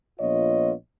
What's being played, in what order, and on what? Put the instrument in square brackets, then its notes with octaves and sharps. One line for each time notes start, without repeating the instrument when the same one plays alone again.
[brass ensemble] A#1 B3 F4 C#5 D#5